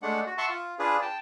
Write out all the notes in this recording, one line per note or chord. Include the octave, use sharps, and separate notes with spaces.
G#3 A3 D4 F#5
F#4
E5 F#5 A5 C6 C#6
F4
D4 F4 G#4 B4
G5 A5